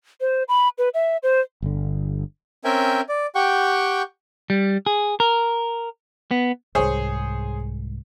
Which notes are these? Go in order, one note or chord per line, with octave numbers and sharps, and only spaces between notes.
C5
B5
B4
E5
C5
G1 D3
C4 C#4 A#4 E5 G5 G#5
D5
G4 F#5 G5 C#6
G3
G#4
A#4
B3
C2 G#2 G#4 C5 C#5